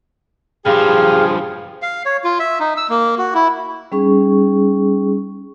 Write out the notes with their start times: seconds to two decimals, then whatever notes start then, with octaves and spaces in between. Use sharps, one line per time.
0.66 G2 F3 G4 G#4 F5
1.82 F5
2.05 C#5
2.24 F4
2.39 E5
2.60 D#4
2.77 E6
2.90 A#3
3.18 F#4
3.35 E4
3.92 G3 C#4 D#4 G#4 C#6